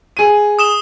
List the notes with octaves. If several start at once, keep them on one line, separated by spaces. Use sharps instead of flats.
G#4 D#7
D#6 E7 G7